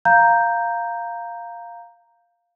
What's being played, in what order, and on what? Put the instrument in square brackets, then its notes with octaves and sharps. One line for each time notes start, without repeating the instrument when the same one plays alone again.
[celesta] F5 A#5 G6